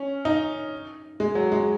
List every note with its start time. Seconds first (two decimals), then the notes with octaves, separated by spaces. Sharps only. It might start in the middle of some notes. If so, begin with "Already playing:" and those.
Already playing: C#4
0.25 D#4
1.20 G#3
1.35 F#3
1.52 G#3